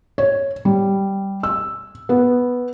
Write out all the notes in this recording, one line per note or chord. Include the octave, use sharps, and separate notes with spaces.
C#5
G3
E6
B3